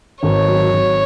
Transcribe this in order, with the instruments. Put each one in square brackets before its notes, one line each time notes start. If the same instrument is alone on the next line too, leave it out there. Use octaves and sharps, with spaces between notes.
[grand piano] G#1 [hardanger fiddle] C#5
[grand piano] F#3
G#1